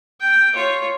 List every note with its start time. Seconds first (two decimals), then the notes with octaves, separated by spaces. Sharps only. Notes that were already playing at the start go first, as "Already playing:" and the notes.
0.20 G5
0.53 F4 C#5